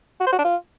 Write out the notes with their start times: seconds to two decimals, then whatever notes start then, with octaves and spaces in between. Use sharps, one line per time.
0.21 F#4
0.27 C5
0.33 F#4
0.39 D4
0.45 F4